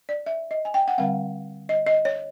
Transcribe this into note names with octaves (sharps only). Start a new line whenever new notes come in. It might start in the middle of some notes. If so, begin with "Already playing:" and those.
D5
E5
D#5
G#5
G5
F#5
D3 G3 C4 F5
D#5
D#5
C#5